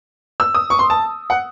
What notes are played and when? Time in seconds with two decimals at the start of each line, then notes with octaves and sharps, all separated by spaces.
0.40 E6
0.55 D#6
0.70 C#6
0.79 C6
0.90 A5
1.30 F#5